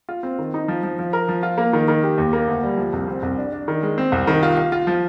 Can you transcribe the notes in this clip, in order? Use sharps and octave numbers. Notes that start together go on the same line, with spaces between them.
F4
C4
D#3
D#4
F3
F3
F3
A#4
F3
F4
A#3
D#3
D#3
G4
D#2
A#3
D2
G3
F3
C2
C4
C2
D4
D4
D#3
G#3
C4
C2
D#3
F4
F4
F4
F3